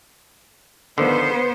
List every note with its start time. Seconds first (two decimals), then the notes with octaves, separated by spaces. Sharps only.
0.98 D3 D#3 F3 B3 C5